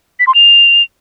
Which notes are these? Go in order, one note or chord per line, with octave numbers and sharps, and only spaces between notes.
B6
C6
F7